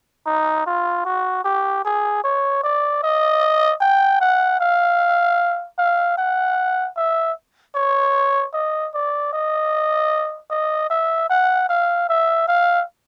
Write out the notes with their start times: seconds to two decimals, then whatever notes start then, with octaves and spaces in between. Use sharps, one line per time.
0.26 D#4
0.66 F4
1.05 F#4
1.45 G4
1.85 G#4
2.24 C#5
2.64 D5
3.03 D#5
3.81 G5
4.21 F#5
4.60 F5
5.79 F5
6.18 F#5
6.97 E5
7.75 C#5
8.54 D#5
8.94 D5
9.33 D#5
10.51 D#5
10.90 E5
11.30 F#5
11.69 F5
12.09 E5
12.48 F5